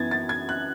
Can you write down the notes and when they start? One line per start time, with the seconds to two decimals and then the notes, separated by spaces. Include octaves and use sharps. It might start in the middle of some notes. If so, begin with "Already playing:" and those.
Already playing: F#2 E3 B3 G#6 A6
0.11 A6
0.29 G#6
0.49 F#6